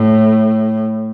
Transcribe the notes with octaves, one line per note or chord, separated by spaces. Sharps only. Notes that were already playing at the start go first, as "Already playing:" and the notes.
Already playing: A2